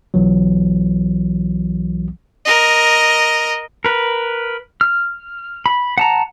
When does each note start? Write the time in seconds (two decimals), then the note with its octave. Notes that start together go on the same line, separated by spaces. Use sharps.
0.14 B1 E3 F#3
2.46 A#4 D#5
3.85 A#4 B4
4.81 F6
5.66 B5
5.98 F#5 A5 A#5